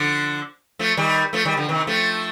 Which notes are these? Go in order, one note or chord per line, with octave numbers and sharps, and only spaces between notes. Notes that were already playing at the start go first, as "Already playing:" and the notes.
Already playing: D3 F3
F3 A3
D#3 G3
F3 A3
D#3 G3
D3 F3
C3 D#3
F3 A3